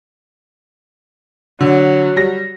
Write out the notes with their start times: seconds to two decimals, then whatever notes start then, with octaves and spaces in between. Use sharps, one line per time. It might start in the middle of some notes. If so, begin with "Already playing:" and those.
1.61 D3 F#3
2.16 G3 A#6